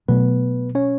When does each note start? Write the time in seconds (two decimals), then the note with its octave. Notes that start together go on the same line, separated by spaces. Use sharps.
0.08 B2 F#3 A3 B3 B4
0.75 C#4 C#5